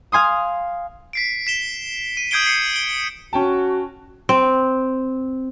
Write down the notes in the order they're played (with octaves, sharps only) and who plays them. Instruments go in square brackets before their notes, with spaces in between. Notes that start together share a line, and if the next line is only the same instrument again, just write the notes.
[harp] F5 G#5 C6 D#6
[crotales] B6 C7 D7
B6 E7 G7
D#7
D#6 G6 G#6 C7 D7 G7
C7 C#7
D7 G7
[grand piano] C#4 G5 A5 [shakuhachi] F#4
[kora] C4